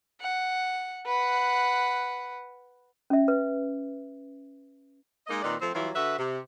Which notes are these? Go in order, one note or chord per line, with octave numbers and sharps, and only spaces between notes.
F#5
B4 F#5
C#4 E5
B4
G#3 A#3 D#4 D#5
A#2 D#3 C4 B4 D5
F3 A3 C4
E3 F#3 G3 E4 F4
D3 F#4 B4 E5
C3